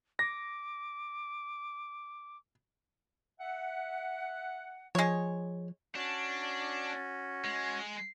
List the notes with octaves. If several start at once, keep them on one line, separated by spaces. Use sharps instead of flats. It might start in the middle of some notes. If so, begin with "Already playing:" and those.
D6 A#6
E5 F#5
F3 G#3 C#5
C#4 D4 F#4
G#3